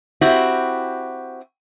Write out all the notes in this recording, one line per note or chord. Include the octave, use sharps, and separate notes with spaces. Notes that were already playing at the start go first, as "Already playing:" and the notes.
C4 E4 F#4 G4